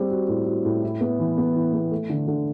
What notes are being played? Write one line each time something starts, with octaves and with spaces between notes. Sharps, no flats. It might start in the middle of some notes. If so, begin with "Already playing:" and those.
Already playing: G3 C4
F#4
A2
F#4
A2
E4
B3
E3
B3
E3
B3
A3
D3
D3